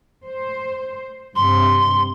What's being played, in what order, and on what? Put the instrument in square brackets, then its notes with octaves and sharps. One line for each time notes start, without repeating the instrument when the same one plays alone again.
[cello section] C5
[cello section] G2 C3 [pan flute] C6